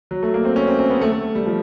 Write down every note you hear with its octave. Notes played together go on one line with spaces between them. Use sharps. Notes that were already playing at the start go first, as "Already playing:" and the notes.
F#3
A3
A#3
C4
C#4
C4
C4
B3
A3
A3
G3
F3